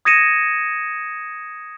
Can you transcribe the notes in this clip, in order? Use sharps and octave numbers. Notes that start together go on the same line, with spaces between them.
D#6 G#6 A#6 C#7 D#7 E7